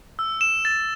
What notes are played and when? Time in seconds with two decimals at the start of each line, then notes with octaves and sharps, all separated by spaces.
0.19 E6
0.41 E7
0.65 A6